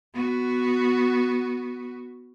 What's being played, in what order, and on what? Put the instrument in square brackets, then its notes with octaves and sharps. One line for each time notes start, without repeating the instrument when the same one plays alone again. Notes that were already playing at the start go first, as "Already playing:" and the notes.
[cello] B3 F#4